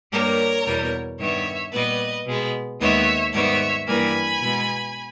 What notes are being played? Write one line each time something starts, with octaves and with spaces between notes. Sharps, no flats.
G2 G3 A#3 A#4 C#5
E2 B2 G3
G2 D#3 G3 B3 C#5 E5
A#2 G3 B3 B4 D#5
B2 G#3 B3
D#2 D#3 G#3 B3 C#5 E5
G#2 D#3 G3 B3 C#5 E5
G2 E3 G3 A#3 G#5 B5
B2 G#3 B3